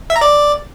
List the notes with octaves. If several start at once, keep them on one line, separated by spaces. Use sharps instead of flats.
E5
A#5
D5